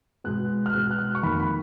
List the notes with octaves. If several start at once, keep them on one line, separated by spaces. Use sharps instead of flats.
B2 G#3 B3 F#6
F6
B2 G#3 B3 F#6
F#6
F6
C#6
F2 D#3 A#3 B5
B5